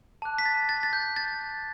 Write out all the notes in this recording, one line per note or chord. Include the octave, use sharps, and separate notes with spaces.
A5 D6 F#6
B6
A6
A6
A6
G6
A6